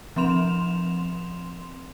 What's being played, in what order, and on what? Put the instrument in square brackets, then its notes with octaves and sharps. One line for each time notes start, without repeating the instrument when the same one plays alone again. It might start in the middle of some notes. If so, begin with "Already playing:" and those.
[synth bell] F3 C4 C6 E7 F7